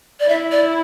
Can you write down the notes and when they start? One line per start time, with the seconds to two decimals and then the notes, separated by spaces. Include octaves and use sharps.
0.20 D5
0.29 E4 E5
0.52 D5